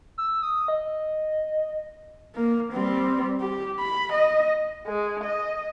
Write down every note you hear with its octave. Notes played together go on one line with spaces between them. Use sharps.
E6
D#6
D#5
A#3
G3 C4
G4
B5
D#5
G#3
D#5